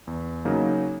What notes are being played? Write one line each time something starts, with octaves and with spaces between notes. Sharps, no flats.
E2
C#3 F#3 A#3 D#4